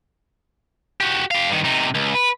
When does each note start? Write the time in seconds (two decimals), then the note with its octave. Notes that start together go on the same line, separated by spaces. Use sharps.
1.01 F#4 G4
1.31 G4 F5
1.50 G2 D#3
1.64 C3 D#4
1.95 C#2
2.15 B4